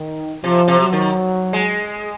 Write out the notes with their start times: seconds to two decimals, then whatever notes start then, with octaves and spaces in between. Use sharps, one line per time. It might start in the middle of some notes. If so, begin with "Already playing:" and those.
Already playing: D#3
0.43 C3 F3
0.68 C3
0.80 F#3
0.93 D#3
1.53 G#3